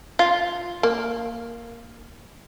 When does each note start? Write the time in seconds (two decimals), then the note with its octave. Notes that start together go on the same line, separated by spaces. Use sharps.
0.19 F4
0.83 A#3